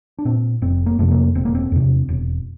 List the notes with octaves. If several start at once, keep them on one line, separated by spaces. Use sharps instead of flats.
D4
A#2 C4
F1 C4
A#3
F2 C3 A3
A#3
E1 C4
A#3
C4
E2 C3
E1